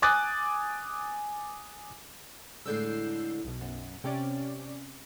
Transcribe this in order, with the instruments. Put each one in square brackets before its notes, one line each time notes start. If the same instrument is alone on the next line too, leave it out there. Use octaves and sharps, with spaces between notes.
[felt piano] G#5 D6 D#6 F#6 A6
[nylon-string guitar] A2 D3 G#3 [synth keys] E6 G6 C7
[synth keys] B1 B2
[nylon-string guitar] F#2
[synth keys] C3 C#4 D5 [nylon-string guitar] G5